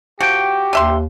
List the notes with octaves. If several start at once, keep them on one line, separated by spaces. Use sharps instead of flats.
F3 F#4 G4 G5
D#2 D3 E5 C6